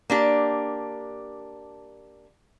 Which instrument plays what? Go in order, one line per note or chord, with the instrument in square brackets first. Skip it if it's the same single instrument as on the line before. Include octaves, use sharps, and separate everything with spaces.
[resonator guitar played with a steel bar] A#3 D4 G4